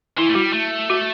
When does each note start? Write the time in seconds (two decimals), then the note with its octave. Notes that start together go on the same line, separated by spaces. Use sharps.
0.17 E3 E4
0.29 A3
0.35 G3 F#4
0.53 A3
0.90 F#4